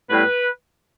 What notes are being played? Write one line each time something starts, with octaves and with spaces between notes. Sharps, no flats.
A2 G3 B3 B4